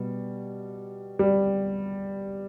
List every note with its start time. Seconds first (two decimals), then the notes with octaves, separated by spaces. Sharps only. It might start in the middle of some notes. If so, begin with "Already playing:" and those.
Already playing: B2 G3
1.19 G3